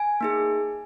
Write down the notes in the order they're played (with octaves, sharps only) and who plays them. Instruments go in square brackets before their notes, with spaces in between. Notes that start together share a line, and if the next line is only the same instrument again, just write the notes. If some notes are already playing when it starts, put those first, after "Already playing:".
Already playing: [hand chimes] G#5
A#3 D#4 G#4